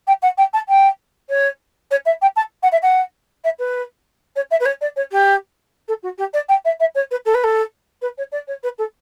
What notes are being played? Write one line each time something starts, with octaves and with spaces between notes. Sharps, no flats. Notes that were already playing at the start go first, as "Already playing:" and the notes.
G5
F#5
G5
A5
G5
C#5
C#5
E5
G5
A5
F#5
E5
F#5
E5
B4
C#5
E5
B4
C#5
D5
C#5
G4
A4
F#4
G4
D5
G5
E5
E5
C#5
B4
A4
B4
A4
B4
C#5
D5
C#5
B4
A4